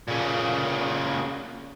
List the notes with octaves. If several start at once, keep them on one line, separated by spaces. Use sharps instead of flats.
A#2 C#3